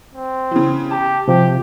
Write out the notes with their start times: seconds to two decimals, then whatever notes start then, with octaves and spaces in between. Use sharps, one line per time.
0.15 C4
0.51 C#3 E3
0.91 G4 A5
1.28 C3 F3 G4